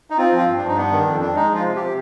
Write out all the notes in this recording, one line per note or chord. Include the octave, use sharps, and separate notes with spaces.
D#4
C4 F4
F3
F4
G2
G2 D4
D#4
B3 D4
D#3
F2
D4
G#3 D#4
F3 F4
C3
C3 G4